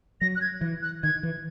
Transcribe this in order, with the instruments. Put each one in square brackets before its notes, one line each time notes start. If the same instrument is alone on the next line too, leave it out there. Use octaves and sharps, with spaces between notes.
[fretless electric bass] F#3 [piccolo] A#6
[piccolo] F#6
G#6
[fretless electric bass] E3
[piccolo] F#6
[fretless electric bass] D#3 [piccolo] G#6
[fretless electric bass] E3